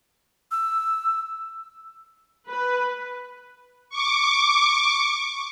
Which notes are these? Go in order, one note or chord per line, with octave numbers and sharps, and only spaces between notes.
E6
B4
C#6 D6